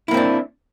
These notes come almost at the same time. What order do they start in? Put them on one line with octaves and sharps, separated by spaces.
E4 A#3 C4 D4